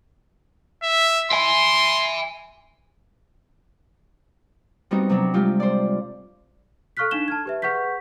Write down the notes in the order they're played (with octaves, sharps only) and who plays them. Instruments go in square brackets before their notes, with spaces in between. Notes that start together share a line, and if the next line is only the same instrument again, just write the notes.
[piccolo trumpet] E5
[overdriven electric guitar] E5 G#5 [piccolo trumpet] C6
[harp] G3 B3 C4 D#4 F#4
C3 F#3 D4
G3 G#3 F4 G4
C5 D5
[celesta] A4 F5 C#6 F6 F#6 B6
D4 D#4 F5 E7 G7
A5 F6 G#6
G4 B4 E5
G#4 B4 F#5 C#6 G6 B6